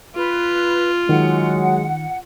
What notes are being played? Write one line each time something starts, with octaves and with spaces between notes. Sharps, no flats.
F4 B4
D#3 F#3 G#3 F#5